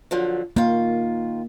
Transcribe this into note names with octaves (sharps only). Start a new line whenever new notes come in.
D3 F3 F#3
D#3 A#3 F4